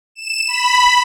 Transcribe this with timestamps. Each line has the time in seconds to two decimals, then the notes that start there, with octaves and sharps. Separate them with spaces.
0.15 E7
0.48 B5